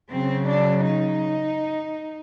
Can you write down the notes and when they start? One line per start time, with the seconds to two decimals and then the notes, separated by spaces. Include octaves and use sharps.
0.10 C#3 F#3 C4
0.47 D4
0.83 D#4